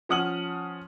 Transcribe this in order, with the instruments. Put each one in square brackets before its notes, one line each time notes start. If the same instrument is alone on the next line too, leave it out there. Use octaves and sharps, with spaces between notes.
[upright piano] F3 C#4 F#5 D#6 F6 F#7